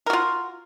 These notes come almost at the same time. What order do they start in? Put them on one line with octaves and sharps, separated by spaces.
A#4 F#4 F4